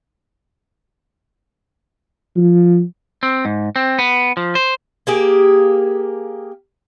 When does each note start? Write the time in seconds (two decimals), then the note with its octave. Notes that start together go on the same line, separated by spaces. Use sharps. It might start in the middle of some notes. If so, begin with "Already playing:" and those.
2.36 F3
3.23 C4
3.45 G#2
3.76 C4
3.99 B3
4.37 F3
4.55 C5
5.07 A#3 G4 G#4